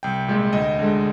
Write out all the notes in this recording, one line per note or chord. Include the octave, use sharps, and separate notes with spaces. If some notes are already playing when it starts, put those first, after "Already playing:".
C2 G5
A#2 G#3
D2 D#5
D3 G#3